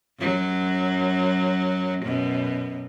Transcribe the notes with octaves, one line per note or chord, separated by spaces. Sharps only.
F#2 F#3
F#2 B2